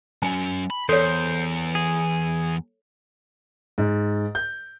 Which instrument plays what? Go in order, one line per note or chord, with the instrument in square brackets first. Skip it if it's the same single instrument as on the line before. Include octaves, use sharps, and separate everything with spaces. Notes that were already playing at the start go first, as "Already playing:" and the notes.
[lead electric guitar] F#3 C#4 [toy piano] G#5
[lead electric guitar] B5
[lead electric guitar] E2 [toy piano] A4 C#5 [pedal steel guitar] C5
[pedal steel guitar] G#4
[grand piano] G#2
G6